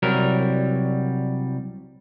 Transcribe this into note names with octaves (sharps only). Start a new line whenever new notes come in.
C2 F#3 G3 A#4